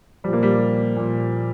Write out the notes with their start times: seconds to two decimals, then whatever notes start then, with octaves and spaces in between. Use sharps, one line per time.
0.24 A#2 F3 G3
0.33 A#3
0.43 G3
0.96 A#2 F3